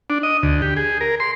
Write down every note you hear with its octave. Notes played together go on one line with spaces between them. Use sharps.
D4
D#5
D2
G4
G#4
A#4
C6